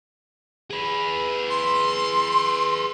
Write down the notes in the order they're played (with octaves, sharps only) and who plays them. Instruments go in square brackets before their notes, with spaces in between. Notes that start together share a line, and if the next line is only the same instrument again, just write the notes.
[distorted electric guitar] G#4 B4
[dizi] C6